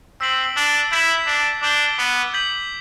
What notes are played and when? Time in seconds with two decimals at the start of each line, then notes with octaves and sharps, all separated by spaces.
0.21 C4 E6 B6 F#7
0.57 D4
0.92 E4 G6 B6 E7
1.26 D4
1.62 D4 D6 G6 D7 G7
1.98 B3
2.34 G6 B6 F#7